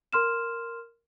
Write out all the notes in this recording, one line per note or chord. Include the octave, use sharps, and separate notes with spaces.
A#4 C6 F6 E7